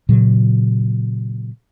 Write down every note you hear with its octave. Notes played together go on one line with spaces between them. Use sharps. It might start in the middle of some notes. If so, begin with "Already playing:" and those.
A#2 C#3 F#3